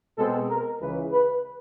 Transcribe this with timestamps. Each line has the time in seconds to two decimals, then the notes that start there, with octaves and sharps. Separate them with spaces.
0.17 B2 G#3 C4 A4
0.49 A#4
0.80 C#2 C#3 E3 G#3 B4
1.12 B4